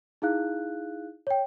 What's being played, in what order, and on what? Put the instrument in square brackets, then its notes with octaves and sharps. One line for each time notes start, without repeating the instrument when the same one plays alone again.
[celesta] D#4 E4 G#4 F5 F#6
C#5 G5